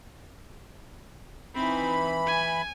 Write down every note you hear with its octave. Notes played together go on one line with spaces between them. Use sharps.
E3 C4 D#4 B5
G#5